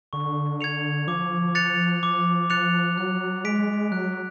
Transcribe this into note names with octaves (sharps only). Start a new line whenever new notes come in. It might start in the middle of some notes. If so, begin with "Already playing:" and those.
D3 C#6
G#6 C#7 F7
F3 D6
F#6 A6 C#7 F7
F3 D6
F3 F#6 A6 C#7 F7
F#3 F#6
G#3 B6 D7
F#3 F#6